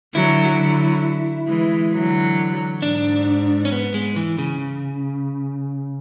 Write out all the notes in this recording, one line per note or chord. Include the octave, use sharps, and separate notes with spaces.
D3 F#3 E4
D3 F#3
E3 G#3
D3 F#3
G#2 D4
C#4
B3
G#3
E3
C#3